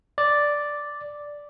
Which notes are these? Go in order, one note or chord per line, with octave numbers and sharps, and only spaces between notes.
D5